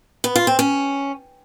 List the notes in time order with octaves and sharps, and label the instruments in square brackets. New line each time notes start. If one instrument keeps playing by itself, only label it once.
[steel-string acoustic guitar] B3
F4
C4
C#4